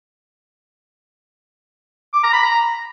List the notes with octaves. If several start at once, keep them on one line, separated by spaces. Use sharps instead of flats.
D6
A#5
B5
A#5